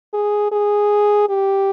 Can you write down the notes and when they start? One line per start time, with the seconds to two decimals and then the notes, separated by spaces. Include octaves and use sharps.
0.13 G#4
0.52 G#4
1.29 G4